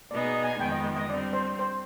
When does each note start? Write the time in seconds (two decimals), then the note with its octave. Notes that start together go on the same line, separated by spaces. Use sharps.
0.11 B2 B3 D#4 G#4 D5
0.44 G#5
0.60 F2 D#3 G#3 B3 G5
0.72 D#5
0.96 D#5
1.10 D3 G3 C4 D5
1.33 C5
1.59 C5